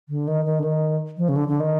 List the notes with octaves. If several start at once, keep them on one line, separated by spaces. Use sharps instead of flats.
D3
D#3
D#3
D3
D#3
F3
C#3
D3
D3
D#3